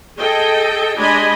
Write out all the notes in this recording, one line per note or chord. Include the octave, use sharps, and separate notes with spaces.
G#4 A4 D#5 G5
G#3 D4 G4 D#5 G#5 B5